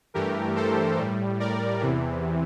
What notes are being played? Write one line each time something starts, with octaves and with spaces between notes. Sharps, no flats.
G2 E3 A3 G4 A#4
A4 C5
A2 G3
A#4 D5
E2 C3 E3